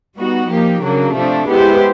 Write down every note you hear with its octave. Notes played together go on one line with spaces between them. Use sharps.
G3 B3 D#4 F#4
F3 A#3 D#4 G4
C#3 F#3 A#3 D4
C3 F3 A3 D4
G#3 B3 E4 G4 C5